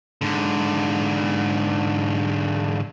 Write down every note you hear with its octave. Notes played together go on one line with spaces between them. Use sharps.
G#2 D3